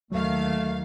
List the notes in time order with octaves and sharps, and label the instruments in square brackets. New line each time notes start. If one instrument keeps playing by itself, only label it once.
[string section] D#2 D#3 F5 [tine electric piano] F#3 [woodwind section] A3